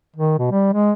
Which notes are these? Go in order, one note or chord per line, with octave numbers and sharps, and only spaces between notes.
D#3
B2
G3
G#3